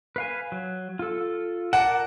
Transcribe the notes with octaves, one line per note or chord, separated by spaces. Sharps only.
B4 F5 G#5
F#3
F4 A4
A#4 D5 F#5 A5